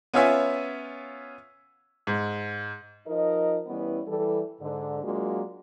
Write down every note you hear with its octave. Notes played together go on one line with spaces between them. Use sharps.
B3 C#4 F4 C#5 E5 G#5
G#2
F3 D#4 A#4 D#5
E3 G3 B3 C#4 E4 B4
E3 G3 A4
G#2 D3
F#3 G#3 A#3 D4 F4 F#4